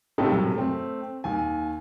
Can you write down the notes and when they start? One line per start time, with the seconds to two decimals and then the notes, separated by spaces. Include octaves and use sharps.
0.18 A2 C#3 C4 D#4 G4 A4
0.31 F#2 C3
0.55 A3 C4
1.24 D#2 G#5